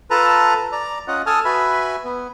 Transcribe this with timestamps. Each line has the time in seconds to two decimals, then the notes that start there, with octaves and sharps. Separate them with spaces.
0.10 F4 A4 B4 A5 A#5
0.72 D5 A#5
1.08 C#4 F4 D#5 F#5
1.26 A4 G#5 A5 D#6 F6
1.45 F#4 B4 E5 G#5 B5
2.04 B3